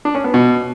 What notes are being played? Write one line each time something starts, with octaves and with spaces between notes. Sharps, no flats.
D4
C#4
B3
B2